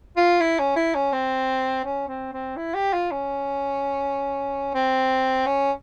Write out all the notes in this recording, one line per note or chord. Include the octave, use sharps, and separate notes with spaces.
F4
E4
C#4
E4
C#4
C4
C#4
C4
C4
E4
G4
F4
C#4
C4
C#4